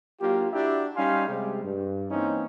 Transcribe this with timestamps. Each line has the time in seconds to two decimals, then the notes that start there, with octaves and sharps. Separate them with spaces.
0.21 F#3 A#3 D4 F4 G4
0.53 D4 E4 F#4 G4 E5 A#5
0.96 G3 C#4 D#4 F5 G#5 C6
1.27 C3 G3 G#3
1.64 G2
2.11 E3 A#3 C4 C#4 D#4